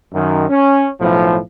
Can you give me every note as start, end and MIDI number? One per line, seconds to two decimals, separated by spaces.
0.13 0.49 42
0.13 0.49 51
0.50 0.86 61
1.00 1.37 35
1.00 1.37 45
1.00 1.37 53